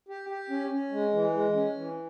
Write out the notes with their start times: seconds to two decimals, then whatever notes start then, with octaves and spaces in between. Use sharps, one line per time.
0.09 G4
0.29 G4
0.50 C#4
0.71 C#4
0.92 G#3
1.13 E3
1.33 G#3
1.55 C#4
1.76 E3